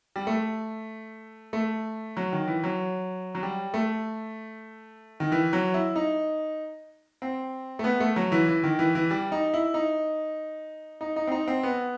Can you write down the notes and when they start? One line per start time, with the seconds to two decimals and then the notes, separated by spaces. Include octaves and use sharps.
0.16 G3
0.27 A3
1.53 A3
2.17 F#3
2.33 D#3
2.47 E3
2.64 F#3
3.35 F#3
3.43 G3
3.74 A3
5.20 D#3
5.32 E3
5.53 F#3
5.74 E4
5.96 D#4
7.22 C4
7.79 A3
7.84 B3
8.00 A3
8.16 F#3
8.32 E3
8.48 E3
8.64 D#3
8.79 E3
8.95 E3
9.11 G3
9.32 D#4
9.54 E4
9.74 D#4
11.01 D#4
11.16 D#4
11.27 C4
11.32 D#4
11.48 C4
11.63 B3